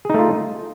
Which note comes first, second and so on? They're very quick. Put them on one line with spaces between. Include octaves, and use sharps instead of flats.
G#4 D#4 A3 F4